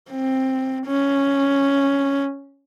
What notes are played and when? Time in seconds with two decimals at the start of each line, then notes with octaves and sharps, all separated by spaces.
0.10 C4
0.86 C#4